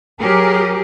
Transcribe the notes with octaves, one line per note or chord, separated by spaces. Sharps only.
F#3 G4 G#4 A#4